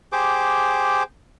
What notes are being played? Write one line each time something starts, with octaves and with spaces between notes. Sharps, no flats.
G4 G#4 C5 D6